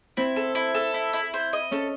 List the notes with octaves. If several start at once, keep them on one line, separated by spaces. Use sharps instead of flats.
C4 E4
A4
E4
A4
E4
E4
C5
D#5
C#4 A4